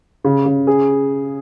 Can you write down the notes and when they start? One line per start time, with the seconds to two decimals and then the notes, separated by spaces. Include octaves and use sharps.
0.24 C#3
0.46 C#3
0.67 G#4